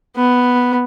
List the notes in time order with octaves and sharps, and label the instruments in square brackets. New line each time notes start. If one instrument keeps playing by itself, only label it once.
[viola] B3